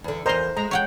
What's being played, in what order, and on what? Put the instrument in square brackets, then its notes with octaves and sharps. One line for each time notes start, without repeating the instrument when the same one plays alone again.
[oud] E2 D3
[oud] E2 A#4 [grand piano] C5 [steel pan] D#5 A#5 C6
[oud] G#3 [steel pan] A#5
[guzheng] C#5 F#5 G5